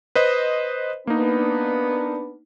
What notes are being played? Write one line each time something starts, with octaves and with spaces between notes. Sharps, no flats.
B4 C5 D#5
A#3 B3 D4 D#4